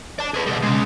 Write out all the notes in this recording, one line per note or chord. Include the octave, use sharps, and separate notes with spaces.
D5 A5
G#4 B4
B2 G3
C#3 G#3